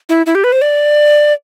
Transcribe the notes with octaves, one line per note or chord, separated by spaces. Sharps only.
E4
E4
G4
B4
C5
D5